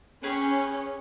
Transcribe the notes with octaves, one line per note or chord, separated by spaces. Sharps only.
C#4 G4 G#4 B4